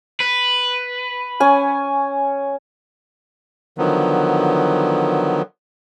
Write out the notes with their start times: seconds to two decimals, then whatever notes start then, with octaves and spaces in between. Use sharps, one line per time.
0.20 B4
1.40 C#4 G#5
3.78 D3 D#3 F3 F#3 B3